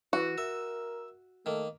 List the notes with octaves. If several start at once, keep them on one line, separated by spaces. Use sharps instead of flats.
E3 F#4
A#4 E5
D#3 A3 A#3